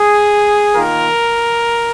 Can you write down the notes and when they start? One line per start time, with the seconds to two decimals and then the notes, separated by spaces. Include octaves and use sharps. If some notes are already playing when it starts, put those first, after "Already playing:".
Already playing: G#4
0.75 D#3 A#3 F4 A#4